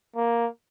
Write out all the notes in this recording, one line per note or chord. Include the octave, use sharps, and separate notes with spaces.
A#3